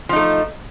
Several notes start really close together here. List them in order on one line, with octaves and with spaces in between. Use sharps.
F3 D#4 A3